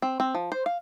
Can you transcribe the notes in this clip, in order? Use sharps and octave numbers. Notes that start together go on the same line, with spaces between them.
C4
C4
F3
C5
F5